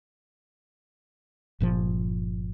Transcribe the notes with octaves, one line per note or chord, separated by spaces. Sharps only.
G1 A#2 F3